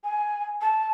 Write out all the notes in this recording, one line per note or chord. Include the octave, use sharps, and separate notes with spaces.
G#5
A5